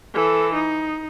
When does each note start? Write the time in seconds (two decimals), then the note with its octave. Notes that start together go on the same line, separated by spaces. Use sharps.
0.14 E3 A4
0.54 D#4